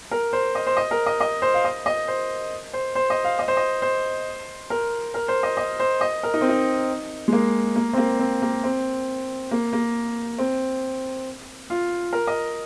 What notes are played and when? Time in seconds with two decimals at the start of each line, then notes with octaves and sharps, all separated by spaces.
0.11 A#4
0.33 C5
0.55 D#5
0.67 C5
0.77 D#5
0.91 A#4
1.06 D#5
1.21 D#5
1.42 C5
1.54 F5
1.64 D#5
1.86 D#5
2.08 C5
2.73 C5
2.95 C5
3.10 D#5
3.24 F5
3.39 D#5
3.48 C5
3.57 D#5
3.82 C5
4.70 A#4
5.14 A#4
5.28 C5
5.43 D#5
5.57 D#5
5.79 C5
6.01 D#5
6.23 A#4
6.34 D#4
6.41 C4
6.49 D#4
7.28 G#3
7.33 A#3
7.76 A#3
7.93 C4
7.98 A#3
8.19 C4
8.42 A#3
8.64 C4
9.51 A#3
9.73 A#3
10.38 C4
11.70 F4
12.13 A#4
12.27 D#5